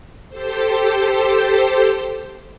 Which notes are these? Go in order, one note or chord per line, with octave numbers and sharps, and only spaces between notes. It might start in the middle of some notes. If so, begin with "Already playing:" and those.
G4 A4 C5